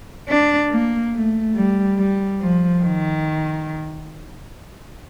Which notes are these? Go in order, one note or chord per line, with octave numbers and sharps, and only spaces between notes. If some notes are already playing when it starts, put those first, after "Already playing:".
D4
A#3
A3
G3
G3
F3
D#3